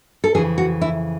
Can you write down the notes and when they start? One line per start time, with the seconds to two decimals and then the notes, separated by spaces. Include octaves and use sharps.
0.24 A4
0.35 F2 C#3 E3 G#4
0.58 F#4
0.81 E4